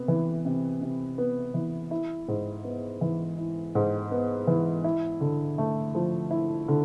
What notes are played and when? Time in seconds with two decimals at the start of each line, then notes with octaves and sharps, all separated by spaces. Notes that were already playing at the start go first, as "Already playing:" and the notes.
Already playing: C3 B3
0.08 E3
0.45 C3
0.81 C3
1.18 B3
1.54 E3
1.91 E4
2.28 G#2
2.64 B3
3.01 E3
3.38 E4
3.75 G#2
4.12 B3
4.47 E3
4.84 E4
5.21 D3
5.58 A3
5.95 F3
6.31 E4
6.68 D3